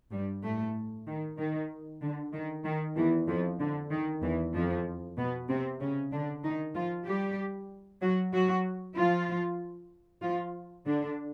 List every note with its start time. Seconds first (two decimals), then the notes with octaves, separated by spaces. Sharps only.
0.12 G2 G3
0.43 A2 A3
1.07 D#3
1.38 D#3
2.02 D3
2.33 D#3
2.64 D#3
2.96 E2 E3
3.28 F2 F3
3.60 D3
3.91 D#3
4.23 E2 E3
4.54 F2 F3
5.18 B2 B3
5.49 C3 C4
5.81 C#3 C#4
6.12 D3 D4
6.44 D#3 D#4
6.75 F3 F4
7.07 G3 G4
8.02 F#3 F#4
8.33 F#3 F#4
8.97 F3 F4
10.23 F3 F4
10.86 D3 D4